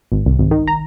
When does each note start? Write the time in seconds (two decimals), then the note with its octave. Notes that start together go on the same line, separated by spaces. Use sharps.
0.12 G#1
0.26 C2
0.39 G#1
0.51 D#3
0.68 A#5